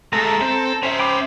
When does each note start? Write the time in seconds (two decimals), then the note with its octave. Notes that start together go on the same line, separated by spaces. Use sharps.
0.13 G#3 A3 A4 A#5
0.41 C4 A4
0.83 C#4 C5 E5
0.99 G5 B5 D6